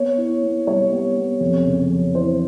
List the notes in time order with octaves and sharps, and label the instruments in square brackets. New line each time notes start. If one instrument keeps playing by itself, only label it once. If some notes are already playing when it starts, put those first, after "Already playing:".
Already playing: [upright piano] B3 C#5
E4
B3
G3 C#5
B3
B3
F2
C#3
F2
E3 C5